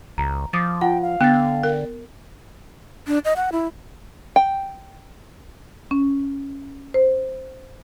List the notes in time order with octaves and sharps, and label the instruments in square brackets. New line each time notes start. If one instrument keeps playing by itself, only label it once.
[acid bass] C#2 [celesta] A#5
[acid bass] F3 [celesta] D6 D#6 A6
[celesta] F4 F#5 [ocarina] G5
[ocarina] F5
[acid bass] D3 [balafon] B3 [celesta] G5 A6
[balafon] A#4
[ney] D4
D#5
F#5
E4
[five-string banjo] G5
[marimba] C#4
C5